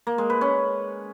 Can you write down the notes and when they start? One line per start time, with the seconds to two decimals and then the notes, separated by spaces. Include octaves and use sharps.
0.07 A#3
0.18 G#3
0.30 B4
0.41 C#4